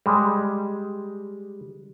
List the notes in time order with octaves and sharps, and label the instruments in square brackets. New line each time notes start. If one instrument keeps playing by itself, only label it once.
[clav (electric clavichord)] G3 G#3